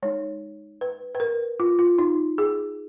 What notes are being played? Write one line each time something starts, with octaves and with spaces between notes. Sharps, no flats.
G#3 D#4 C#5
B4
B4
A#4
F4
F4
D#4
G#4